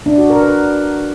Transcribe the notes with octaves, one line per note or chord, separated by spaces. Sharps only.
D4
F#4
A#4
B4